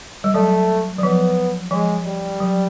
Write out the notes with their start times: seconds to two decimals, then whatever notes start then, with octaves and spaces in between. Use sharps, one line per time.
0.24 G3
0.34 F#3 A3
0.98 F#3
1.03 F3 B3
1.71 F3 G#3
2.06 G3
2.40 F#3